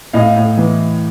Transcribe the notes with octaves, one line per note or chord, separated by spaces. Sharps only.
A2 D#5 F5
A2
E3